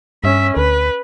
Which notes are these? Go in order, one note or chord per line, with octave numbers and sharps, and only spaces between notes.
G2 C#4 E5
D2 B4